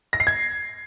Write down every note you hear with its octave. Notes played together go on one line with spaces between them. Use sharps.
A#6
C7
G#6